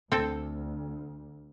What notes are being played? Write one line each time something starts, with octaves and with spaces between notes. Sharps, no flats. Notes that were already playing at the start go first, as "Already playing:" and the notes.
D2 C4 A4